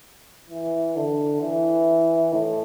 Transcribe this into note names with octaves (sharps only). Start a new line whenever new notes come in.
E3
D3
E3
A2